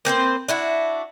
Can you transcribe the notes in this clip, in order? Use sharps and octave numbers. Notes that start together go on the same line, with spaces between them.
A#3 C4 B4 C5
D4 E4 F#4